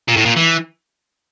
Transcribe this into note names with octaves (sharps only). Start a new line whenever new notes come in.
A#2
A2
A#2
E3